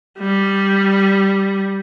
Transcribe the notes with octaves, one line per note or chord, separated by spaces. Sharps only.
G3